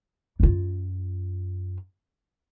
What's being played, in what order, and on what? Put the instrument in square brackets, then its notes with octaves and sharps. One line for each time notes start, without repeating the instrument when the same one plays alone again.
[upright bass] F#2 F4